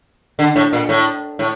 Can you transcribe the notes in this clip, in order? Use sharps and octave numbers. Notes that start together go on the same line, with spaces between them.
D3
A2
A#2
A2
A2